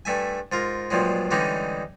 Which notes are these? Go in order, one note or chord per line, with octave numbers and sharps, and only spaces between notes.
G2 A3 E5 G#5
G#2 F4 A#4
G2 A#2 F3 F#3 G#3
D3 E3 G3 G#3 C#4 D#4